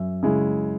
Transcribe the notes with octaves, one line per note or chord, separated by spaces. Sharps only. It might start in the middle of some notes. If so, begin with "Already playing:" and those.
Already playing: F#2 E5
C#3 G#3 C#4 E4